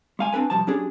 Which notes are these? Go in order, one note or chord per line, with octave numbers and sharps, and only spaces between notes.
G#3 F5 G#5
C4 D4 A#4 B4 G#5
C2 G2 F3 G3 A5
F#3 C#4 D4 G4 G#4